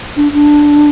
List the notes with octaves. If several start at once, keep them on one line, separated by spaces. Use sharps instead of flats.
D4
D4